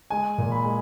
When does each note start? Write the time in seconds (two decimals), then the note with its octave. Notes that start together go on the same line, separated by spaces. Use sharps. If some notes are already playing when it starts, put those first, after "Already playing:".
0.10 G#3 G#5
0.38 A#2
0.52 B5
0.65 G#3